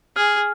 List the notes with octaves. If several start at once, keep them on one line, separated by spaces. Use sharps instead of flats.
G#4 F6